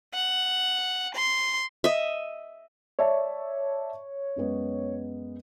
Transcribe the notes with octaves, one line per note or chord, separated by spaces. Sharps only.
F#5
C6
D#5 E5
C#5 D5 E5 A5
F#2 G#3 B3